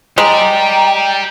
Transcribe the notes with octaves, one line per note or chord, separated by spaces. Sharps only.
G#3 G4 D5 G5 A#5